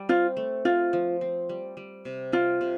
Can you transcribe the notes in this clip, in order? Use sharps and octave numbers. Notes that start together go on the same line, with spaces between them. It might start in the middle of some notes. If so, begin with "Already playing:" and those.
Already playing: G3
C4 F4
A3
C4 F4
F3
C4
G3
G3
C3
G3 F4
C3